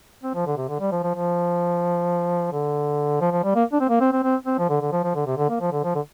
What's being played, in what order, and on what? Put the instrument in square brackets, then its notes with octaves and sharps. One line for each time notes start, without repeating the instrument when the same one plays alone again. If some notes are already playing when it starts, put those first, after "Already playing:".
[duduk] C4
F3
D3
C3
D3
G3
F3
F3
F3
D3
F3
F3
G3
A#3
D4
C4
A#3
C4
C4
C4
C4
F3
D3
D3
F3
F3
D3
C3
D3
A#3
F3
D3
F3
D3